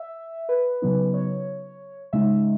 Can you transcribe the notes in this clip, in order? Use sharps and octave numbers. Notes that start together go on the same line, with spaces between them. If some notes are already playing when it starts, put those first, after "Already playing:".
Already playing: E5
B4
C#3 F#3 B3 D#4
C#5
C#3 G#3 D#4 E5